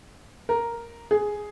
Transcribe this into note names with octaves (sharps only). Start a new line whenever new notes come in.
A#4
G#4